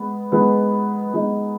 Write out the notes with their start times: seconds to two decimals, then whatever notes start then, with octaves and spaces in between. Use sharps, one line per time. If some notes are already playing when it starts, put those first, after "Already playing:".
Already playing: G#3 B3
0.32 G#3 B3 D#4
1.14 G#3 B3 D#4